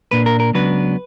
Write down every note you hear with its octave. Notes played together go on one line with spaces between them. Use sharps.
A#2 A#3 D4 B4
A#4
A#4
C#2 C#3 F#3 B3 D4 B4